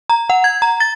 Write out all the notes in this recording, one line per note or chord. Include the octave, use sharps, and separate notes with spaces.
A#5
F#5
G#6
A#5
A6